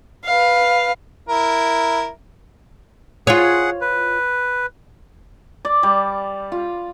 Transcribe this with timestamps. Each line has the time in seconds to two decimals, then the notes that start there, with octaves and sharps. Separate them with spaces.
0.25 B4 F5
1.29 E4 A#4
3.27 F4 G#4 C#5 F#5
3.81 B4
5.65 D5
5.83 G3
6.52 F4